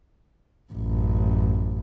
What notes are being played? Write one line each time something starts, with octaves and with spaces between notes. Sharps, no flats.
A1 F#2